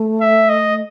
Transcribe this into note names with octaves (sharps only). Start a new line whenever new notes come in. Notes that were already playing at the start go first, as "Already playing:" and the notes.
Already playing: A3
E5
D#5